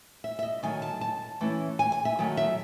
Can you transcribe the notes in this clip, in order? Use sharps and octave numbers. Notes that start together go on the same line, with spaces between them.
E5
E5
D#5
D#3 F#3 A3 D#4 G#5
A5
A5
E3 A3 C#4 E4
G#5
G#5
E5
D#3 F#3 A3
E5